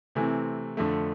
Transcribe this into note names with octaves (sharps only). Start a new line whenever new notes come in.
C3 E3 A3 C4 G#5
F2 D3 A3